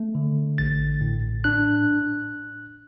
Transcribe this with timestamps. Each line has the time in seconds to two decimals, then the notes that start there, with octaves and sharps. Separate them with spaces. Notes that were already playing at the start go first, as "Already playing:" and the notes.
Already playing: A3
0.15 D3
0.58 A1 A6
1.01 A2
1.44 D4 F#6